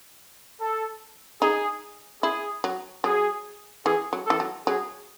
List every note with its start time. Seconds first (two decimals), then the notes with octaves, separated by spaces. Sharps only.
0.61 A4
1.42 D#4 G#4
2.23 E4 G#4
2.64 F#3
3.04 F#3 G#4
3.86 E3 G#4
4.13 F#3
4.26 E3 A4
4.40 F#3
4.67 F#3 G#4